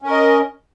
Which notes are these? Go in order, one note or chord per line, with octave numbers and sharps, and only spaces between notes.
C#4 A#4 D#5